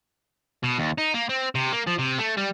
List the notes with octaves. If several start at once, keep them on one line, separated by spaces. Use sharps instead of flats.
B2
D#2
D#4
A#3
C4
C3
A#3
F3
C3
A3
G3